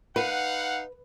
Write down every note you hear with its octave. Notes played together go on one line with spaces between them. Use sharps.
D#4 B4 F5 F#5